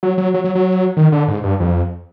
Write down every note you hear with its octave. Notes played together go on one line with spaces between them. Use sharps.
F#3
F#3
F#3
F#3
F#3
D#3
D3
G#2
G2
F2